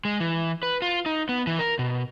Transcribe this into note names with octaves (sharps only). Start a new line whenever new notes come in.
G#3
E3
B4
F4
D#4
B3
E3
A#4
B2